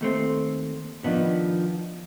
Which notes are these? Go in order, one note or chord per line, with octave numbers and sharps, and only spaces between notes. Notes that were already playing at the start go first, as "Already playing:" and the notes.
D#2 A3 C4
D#3 F3 B3 D4